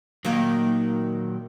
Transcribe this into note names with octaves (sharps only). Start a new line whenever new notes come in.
A#2 D#3 F#3 A#3